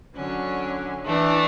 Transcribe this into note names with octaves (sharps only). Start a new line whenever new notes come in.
D3 F#3 C#4
E3 A3 D4